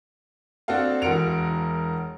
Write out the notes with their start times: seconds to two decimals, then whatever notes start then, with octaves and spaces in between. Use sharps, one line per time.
0.68 C4 D4 F#4 A4 F5
1.02 E1 F#4 A#4 C#7 D7 F7